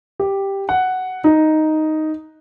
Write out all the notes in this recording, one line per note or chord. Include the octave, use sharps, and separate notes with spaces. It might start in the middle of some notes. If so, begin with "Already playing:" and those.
G4
F#5
D#4